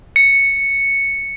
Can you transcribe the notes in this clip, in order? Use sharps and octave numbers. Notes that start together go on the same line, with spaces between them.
C#7